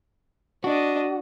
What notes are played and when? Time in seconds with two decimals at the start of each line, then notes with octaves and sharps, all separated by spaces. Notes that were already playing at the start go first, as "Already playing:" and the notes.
0.64 D4 F#4 D#5